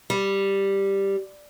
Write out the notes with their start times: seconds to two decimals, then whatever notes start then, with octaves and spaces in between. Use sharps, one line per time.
0.10 G3